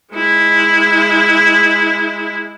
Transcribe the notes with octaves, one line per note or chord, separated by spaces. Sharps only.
G#3 E4